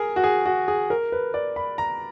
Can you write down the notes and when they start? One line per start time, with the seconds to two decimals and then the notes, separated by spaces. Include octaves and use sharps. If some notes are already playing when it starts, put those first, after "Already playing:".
Already playing: G#4 A#4
0.16 F#4
0.24 G#4
0.46 F#4
0.68 G#4
0.90 A#4
1.12 B4
1.34 D5
1.56 B5
1.78 A#5